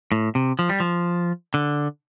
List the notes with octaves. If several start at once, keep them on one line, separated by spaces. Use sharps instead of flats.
A2
C3
F3
G3
F3
D3